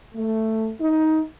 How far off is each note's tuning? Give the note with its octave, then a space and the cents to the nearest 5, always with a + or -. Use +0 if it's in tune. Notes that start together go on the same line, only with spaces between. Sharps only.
A3 +10
D#4 +15